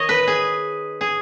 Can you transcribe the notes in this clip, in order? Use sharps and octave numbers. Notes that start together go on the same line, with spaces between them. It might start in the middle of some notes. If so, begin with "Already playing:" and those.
Already playing: D#3 C#5 D#5
B4
G#4
G#4